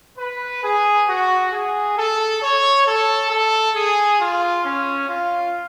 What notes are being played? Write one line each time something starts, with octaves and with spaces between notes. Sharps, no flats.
B4
G#4
F#4
G#4
A4
C#5
A4
A4
G#4
F4
C#4
F4